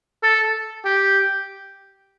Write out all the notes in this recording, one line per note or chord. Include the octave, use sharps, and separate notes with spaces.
A4
G4